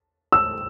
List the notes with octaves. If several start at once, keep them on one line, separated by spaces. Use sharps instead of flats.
E6